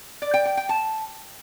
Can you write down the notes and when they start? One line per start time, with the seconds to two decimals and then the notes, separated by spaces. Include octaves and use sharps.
0.22 D5
0.34 G5
0.45 G5
0.57 G5
0.69 A5